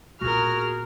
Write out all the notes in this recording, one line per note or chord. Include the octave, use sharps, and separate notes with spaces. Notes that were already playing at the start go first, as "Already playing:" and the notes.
A#2 B3 F#4 G#4 A#4 F6